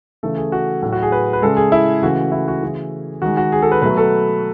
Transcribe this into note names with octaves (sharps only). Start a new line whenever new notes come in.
C#3 E3 A3 A4
G#4
F#4
A2 F#3 A3 F#4
F#4
G#4
B4
B4
C#3 G#3 A4
G#4
E4
C#3 E3 A3 F#4
E4
F#4
C#3 E3 A3 G#4
D#3 G#3 F#4
F#4
G#4
A4
B4
B2 F#3 A3 B4
A4